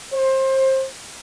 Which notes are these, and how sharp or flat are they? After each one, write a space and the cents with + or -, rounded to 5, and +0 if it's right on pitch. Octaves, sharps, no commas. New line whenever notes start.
C5 +25